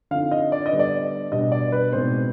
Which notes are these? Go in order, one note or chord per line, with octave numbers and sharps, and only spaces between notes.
D3 F3 C4 D#4 F5
D#5
D5
D#5
D3 G3 B3 D4
D5
B2 G3 D4 D#5
D5
B4
B2 G#3 C4 D#4 C5